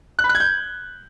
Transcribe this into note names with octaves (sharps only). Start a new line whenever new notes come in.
F#6
B5
F#6
G#6
G6